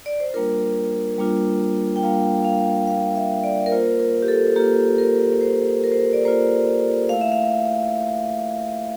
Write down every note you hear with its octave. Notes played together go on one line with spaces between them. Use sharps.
D5
C5
G3 A#3 D4 F4 A#4
G3 A#3 D4 F4
G5
G3 A#3 D4 F4 F5
F5
G3 A#3 D4 F4 F5
E5
D5
A#4
A#3 F4 C5
A#4
G4
A4
A#3 F4 G4
A#4
A#3 F4 C5
A#4
C5
A#4
D5
A#3 F4 C5
A3 E4 F5
E5
F5